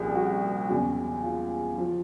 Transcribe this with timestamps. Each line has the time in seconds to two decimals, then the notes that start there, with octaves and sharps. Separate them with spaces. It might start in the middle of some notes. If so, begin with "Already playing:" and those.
Already playing: C2 A#2 F3 G4 G#4
0.15 F#4
0.69 E2 C#3 F#3
1.23 F4
1.78 F3